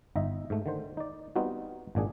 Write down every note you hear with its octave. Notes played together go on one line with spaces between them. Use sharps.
G1 D#4 D#5 E5
G#2 A3
D3 D#3 C5
D#4 D5
G3 B3 C4 D#4 F4 F#4
G#1 A#2 D4 G#4